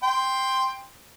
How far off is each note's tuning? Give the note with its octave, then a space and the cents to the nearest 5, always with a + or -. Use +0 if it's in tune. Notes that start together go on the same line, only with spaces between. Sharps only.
G5 +10 C6 +0